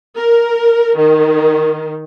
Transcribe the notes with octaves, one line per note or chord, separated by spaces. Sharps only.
A#4
D#3